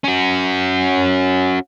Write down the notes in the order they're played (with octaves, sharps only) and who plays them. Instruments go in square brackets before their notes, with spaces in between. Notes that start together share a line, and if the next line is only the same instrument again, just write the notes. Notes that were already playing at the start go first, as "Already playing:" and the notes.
[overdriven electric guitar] C#4 F#4